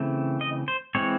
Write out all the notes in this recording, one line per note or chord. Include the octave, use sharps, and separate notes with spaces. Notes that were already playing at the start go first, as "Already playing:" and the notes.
Already playing: C#3 E3 A3 C4
D#5
C5
E3 G#3 C4 C#5